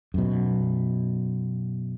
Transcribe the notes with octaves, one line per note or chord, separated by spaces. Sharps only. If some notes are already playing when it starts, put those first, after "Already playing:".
F#2 B2